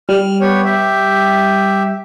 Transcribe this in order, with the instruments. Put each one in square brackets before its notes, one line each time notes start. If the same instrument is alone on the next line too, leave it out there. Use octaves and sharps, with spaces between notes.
[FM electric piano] G3 [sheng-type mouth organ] F6
[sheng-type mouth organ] B3 G4 C#5
G4 E5